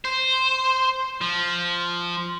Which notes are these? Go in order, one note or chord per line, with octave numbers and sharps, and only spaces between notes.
C5
F3